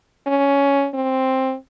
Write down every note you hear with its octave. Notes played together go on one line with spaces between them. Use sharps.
C#4
C4